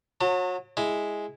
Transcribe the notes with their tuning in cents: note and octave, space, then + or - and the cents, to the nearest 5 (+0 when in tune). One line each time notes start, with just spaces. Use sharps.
F#3 -30 A5 +45
G#3 +0 E4 +0